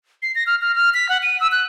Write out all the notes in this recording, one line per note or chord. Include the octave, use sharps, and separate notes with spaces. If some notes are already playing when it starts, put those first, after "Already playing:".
C7
A#6
F6
F6
F6
B6
F#5
D#7
E6
F#6